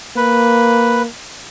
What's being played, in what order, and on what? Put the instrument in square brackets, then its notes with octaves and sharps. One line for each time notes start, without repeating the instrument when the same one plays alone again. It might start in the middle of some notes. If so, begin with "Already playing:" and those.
[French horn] A#3 [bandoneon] B4